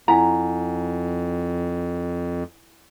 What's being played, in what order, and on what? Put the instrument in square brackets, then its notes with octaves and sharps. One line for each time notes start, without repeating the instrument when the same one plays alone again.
[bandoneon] F2 [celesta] E4 F#5 G#5 [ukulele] A#5